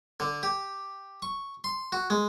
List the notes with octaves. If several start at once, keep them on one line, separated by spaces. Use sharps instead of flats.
D3
G4
C#6
C6
F#4
G#3